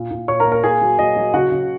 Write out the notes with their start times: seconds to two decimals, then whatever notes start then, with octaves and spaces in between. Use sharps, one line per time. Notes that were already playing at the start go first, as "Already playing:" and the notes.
Already playing: A#2
0.11 A#2
0.28 A#2 C#5 C#6
0.40 A#4 A#5
0.46 A#3
0.52 A#4 A#5
0.63 A#3 G#4 G#5
0.81 F#3
0.99 F#3 D#5
1.16 F#3
1.34 C#3 F#4 F#5
1.51 C#3